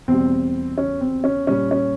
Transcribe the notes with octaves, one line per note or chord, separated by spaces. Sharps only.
E2 B2 G3 C4
C#4
C4
C#4
A#2 G3 C#4
C#4